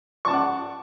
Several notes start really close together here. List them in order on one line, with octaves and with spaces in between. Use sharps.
C#6 A5 D6 F#5